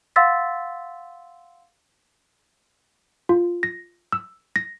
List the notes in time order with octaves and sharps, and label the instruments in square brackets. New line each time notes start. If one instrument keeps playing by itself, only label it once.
[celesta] F5 F#5 C6 E6 A6 B6
[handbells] F4
A#6
E6
A#6